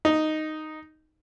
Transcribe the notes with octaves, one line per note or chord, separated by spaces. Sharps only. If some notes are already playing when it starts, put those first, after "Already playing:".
D#4